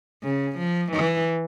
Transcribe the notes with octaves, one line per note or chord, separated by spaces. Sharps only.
C#3
F3
E3